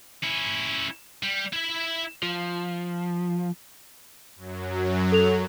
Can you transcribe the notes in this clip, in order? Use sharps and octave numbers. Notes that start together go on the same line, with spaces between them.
C#4 E4
G3
E4 E5
F3
F#2 F#3
A4 F7